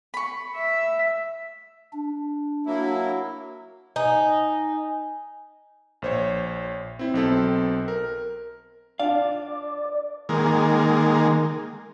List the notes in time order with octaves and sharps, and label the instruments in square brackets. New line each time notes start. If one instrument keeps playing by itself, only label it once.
[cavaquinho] B5 C#6
[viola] E5
[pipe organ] D4
[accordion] F#3 A#3 E4
[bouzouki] D#4 [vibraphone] G#5
[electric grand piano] A#1 C5 C#5
C4 E4
B1 C4 A4
A#4
[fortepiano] D4 F4 [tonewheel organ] D5 [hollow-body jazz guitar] F5
[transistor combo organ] D#3 G#3 A#3